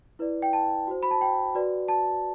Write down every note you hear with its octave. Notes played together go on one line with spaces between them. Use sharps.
E4 B4 D5
G5
A5
F#4 C5
B5
A5
G5
F#4 B4 D5
A5